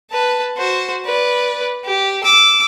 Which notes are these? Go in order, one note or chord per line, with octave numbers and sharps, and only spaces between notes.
B4 A5
F#4 C5
B4 D5
G4
D6 E6